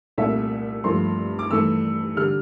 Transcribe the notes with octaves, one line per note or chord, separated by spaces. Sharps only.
C2 A#2 A3 E5
G2 F3 A3 C6
D6
G2 E3 A3 E6
D3 G3 F6